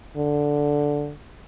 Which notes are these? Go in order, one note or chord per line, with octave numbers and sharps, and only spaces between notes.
D3